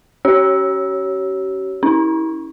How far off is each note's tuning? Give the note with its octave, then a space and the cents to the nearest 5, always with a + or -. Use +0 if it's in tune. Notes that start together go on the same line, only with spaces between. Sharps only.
C#4 +0 G4 -45 C#5 +0
C#4 +5 E4 -30